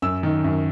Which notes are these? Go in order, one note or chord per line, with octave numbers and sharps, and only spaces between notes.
F#2 E6
D#3
F#2